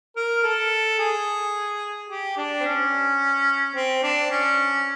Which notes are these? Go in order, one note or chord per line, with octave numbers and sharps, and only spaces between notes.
A#4
A4
G#4
G4
D4
C4
C#4
C4
D4
C#4